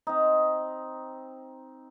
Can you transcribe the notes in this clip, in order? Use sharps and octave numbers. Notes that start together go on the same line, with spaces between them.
C4 D#4